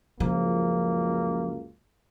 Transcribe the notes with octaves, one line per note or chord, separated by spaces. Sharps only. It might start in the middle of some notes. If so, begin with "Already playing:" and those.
C#2 F#2 C#3 F3 A#3